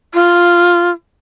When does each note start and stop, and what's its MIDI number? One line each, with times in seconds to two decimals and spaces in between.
0.14 0.90 65